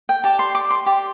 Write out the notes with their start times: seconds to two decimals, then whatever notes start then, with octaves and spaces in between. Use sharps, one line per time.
0.09 G5
0.24 G4 D5 A5
0.39 C6
0.55 D6
0.70 C6
0.86 G4 D5